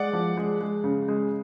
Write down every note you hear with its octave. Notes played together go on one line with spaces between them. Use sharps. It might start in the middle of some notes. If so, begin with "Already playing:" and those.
Already playing: G#3 D5 F#5
F3
G#3
G#3
C#3
G#3